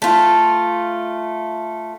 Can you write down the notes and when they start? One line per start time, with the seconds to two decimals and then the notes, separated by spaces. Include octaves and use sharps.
0.02 A3 F4